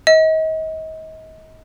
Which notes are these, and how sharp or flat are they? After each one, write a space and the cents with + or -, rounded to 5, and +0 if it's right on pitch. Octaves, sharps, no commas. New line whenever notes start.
D#5 +35